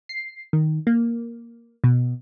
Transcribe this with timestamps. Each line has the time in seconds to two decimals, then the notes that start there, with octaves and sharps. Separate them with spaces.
0.09 C7
0.53 D#3
0.87 A#3
1.84 B2